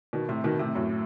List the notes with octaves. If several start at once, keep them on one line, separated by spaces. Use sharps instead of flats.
B2 D#3
A2 C3
B2 D#3
A2 C3
F#2 A2